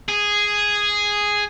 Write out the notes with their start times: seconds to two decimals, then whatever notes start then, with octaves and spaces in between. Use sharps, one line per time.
0.08 G#4